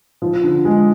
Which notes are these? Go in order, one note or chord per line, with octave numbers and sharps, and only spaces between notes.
F3
D3
G#3